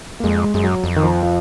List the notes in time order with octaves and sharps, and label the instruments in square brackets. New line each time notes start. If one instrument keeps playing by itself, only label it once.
[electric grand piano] A#3
[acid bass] F2 [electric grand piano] G#3
[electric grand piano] G#3
[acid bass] F#2 [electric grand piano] G#3
[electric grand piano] F#3
[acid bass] F2
[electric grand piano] D#3
F3
F3